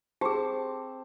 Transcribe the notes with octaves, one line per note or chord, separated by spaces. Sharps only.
C4 G4 G#4 C5 A5